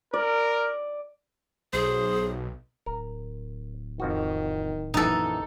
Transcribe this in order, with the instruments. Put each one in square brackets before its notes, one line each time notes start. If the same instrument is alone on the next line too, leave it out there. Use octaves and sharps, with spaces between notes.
[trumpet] A#4 [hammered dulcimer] D5
[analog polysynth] B1 [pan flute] G#4 [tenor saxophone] C5
[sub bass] D1 [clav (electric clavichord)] A#4
[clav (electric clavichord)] F2 F3 F#4 [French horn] D#3
[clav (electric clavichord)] A#1 F#2 E3 [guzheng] D#4 A4